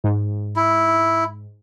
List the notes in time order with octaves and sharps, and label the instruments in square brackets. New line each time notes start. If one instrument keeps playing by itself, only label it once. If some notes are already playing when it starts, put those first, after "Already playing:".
[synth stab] G#2
[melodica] E4